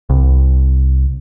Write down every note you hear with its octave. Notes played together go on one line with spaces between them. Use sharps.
C2